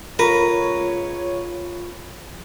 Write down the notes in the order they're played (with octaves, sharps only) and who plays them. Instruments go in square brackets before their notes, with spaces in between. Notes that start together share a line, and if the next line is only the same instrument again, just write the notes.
[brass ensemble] C#2 C#5 [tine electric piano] F4 B5 C#6 [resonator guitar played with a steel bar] A#4 [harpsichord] B4